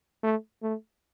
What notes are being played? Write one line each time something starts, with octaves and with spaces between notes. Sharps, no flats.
A3
A3